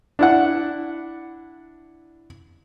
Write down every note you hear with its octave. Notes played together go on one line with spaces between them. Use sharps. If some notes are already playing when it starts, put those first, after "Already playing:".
D4 E4 F#5